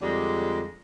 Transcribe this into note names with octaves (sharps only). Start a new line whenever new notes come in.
F2 D3 G3 G#3